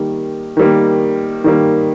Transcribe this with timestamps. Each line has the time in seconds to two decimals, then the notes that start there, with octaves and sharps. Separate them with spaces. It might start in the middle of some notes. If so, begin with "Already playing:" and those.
Already playing: D#3 G3 A#3
0.57 D#3 G3 A#3
1.44 D#3 G3 A#3